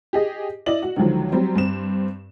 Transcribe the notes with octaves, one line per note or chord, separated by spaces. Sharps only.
G4 G#4 D#5
E4 D5 D#5 F#7
F#4
C#2 D3 D#3 F3 F#3
F#3 G3 C4
G2 C4 E7